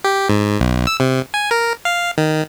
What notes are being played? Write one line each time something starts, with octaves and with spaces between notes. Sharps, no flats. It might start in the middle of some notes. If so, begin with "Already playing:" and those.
G4
G#2
B1
E6
C3
G#5
A#4
F5
D#3